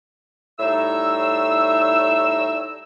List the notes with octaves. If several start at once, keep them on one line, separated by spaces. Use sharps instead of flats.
A2 G3 D#4 E5 E6